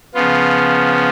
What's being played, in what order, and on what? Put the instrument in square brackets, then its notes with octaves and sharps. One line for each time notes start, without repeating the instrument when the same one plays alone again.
[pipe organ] C#3 F3 B3 F4